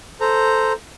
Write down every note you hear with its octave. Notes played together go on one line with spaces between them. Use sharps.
A4 C5 A#5